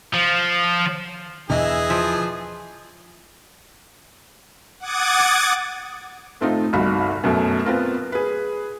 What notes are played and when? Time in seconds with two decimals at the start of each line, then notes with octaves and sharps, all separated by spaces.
0.13 F3
1.50 E2 B2 D3 E3 G#4 D#5 E5
1.90 F3
4.80 F#5 D6 D#6 G#6 A6
6.41 A2 A3 C4 D#4 F4
6.73 G1 C2 D#4 F#4 B5
7.24 F#2 B2 F#3 A3
7.65 B3 C4 F4 A#4
8.12 G#4 B4